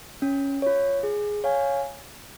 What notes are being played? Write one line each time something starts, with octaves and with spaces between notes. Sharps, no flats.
C#4
F4 C#5
G#4
C#5 F5 G#5